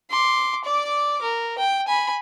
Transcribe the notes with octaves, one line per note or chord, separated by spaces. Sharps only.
C6 D6
D5 D6
A#4
G5
G#5 B5